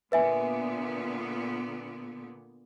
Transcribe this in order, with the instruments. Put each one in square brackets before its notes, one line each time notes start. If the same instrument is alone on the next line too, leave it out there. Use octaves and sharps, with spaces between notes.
[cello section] A#2 D3 B3 [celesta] B4 E5 G#5